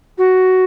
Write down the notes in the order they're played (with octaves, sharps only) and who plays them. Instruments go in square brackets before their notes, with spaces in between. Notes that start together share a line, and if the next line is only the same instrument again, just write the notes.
[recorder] F#4